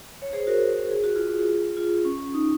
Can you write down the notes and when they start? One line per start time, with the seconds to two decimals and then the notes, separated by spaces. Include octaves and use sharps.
0.22 C#5
0.33 G#4 C5
0.47 F#4 A#4
0.91 G#4
1.03 F#4
1.16 F4 G#4
1.77 F4
2.05 C#4
2.34 D#4